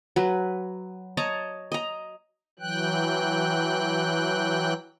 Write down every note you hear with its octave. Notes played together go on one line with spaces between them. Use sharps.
F#3 B4
C#5 D#5 A5 A#5
D#5 A#5
E3 F#3 G5 F#6